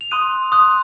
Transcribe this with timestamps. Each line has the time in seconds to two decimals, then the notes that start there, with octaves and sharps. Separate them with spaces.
0.01 F7
0.11 C6 D#6 F#6 D#7
0.52 C6 D#6 F#6